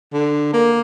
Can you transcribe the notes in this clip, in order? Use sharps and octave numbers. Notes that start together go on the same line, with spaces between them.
D3
A#3